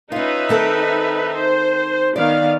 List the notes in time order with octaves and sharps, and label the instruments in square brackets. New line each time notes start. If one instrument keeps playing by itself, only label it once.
[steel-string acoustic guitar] C#4 F4 [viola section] D#4 B4 E5
[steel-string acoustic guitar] D#3 C4 A4
[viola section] C5
[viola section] D#3 B3 F5 [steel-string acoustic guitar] D5